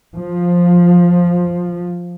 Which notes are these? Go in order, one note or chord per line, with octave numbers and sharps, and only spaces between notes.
F3